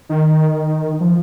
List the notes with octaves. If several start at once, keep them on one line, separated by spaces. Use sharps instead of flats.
D#3
F3